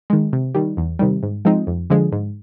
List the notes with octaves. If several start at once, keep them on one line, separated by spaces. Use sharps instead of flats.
D#3 G#3
C3
D#3 G3
E2
C3 D#3 G3
G#2
F3 G#3 C4 D#4
F2
D3 F3 G#3
G#2